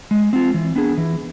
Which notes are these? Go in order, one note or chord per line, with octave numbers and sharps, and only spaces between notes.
G#3
C4 F4
E3
B3 D4 G#4
E3